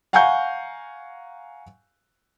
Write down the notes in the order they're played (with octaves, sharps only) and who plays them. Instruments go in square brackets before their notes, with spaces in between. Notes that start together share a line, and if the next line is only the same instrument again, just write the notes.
[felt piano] F5 F#5 G#5 A#5 C#6 G6